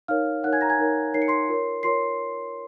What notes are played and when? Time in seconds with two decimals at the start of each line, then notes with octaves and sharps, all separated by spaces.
0.08 D#4 A#4 C#5 F5 F6
0.43 D#4 A#4 C#5 F#5 F#6
0.53 G#5 G#6
0.61 A#5 A#6
0.70 G#5 G#6
0.79 D#4 A#4 C#5
1.14 D#4 A#4 C#5 C7
1.22 C#7
1.28 C6 C7
1.49 F4 A#4 C#5
1.83 F4 A#4 C#5 C6 C7